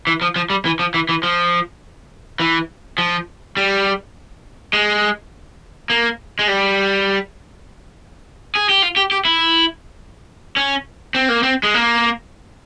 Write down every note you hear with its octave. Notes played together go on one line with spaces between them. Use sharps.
E3
F3
F3
G3
E3
F3
E3
E3
F3
E3
F3
G3
G#3
A#3
G#3
G3
G#4
G4
F4
G4
G4
E4
C#4
C4
A#3
C4
G#3
A#3